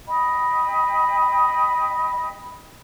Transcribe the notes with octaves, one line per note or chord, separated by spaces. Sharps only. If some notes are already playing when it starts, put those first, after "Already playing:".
D#5 G5 B5